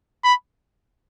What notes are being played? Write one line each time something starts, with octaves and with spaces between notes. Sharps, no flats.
B5